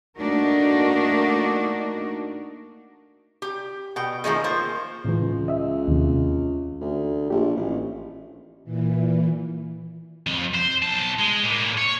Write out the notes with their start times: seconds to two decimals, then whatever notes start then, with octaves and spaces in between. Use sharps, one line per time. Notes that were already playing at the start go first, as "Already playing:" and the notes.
0.17 A3 A#3 D4 D#4 F#4 A#4
3.42 G4
3.96 B2 G5
4.24 D#3 F3 G#3 A3
4.44 A#3 F4 C5
5.04 C#2 A2 C#3 E3
5.48 D#5 E5
5.87 D#2 C3
6.81 D2
7.30 A#1 G4
7.56 A1
8.64 A#2 E3
10.27 F2
10.54 C5
10.82 B1 A5
11.19 G#3
11.44 A2 A#3
11.77 C#5